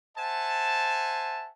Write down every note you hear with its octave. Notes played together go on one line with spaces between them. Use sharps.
C5 E5 F#5 G#5 A5